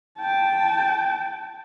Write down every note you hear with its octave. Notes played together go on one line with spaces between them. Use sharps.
G5 A5